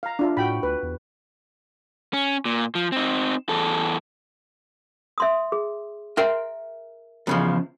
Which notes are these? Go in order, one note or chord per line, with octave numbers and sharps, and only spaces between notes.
F5 A#5
D4 F4 E5
A2 F#4 G5 B5
D2 B4
E2
C#4
A#2
F3
C4 D#4
E2 A4
E5 C6 D#6
G#4
A#4 E5 G5 C6
E2 C#3 F3